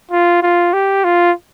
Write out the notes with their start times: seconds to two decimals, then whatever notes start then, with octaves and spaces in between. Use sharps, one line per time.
0.11 F4
0.43 F4
0.73 G4
1.04 F4